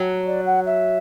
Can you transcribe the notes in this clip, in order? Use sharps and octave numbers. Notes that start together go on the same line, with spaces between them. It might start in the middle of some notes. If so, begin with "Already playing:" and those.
Already playing: F#3
D5
F#5
E5